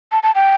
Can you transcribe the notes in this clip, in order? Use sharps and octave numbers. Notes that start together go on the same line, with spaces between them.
A5
A5
G5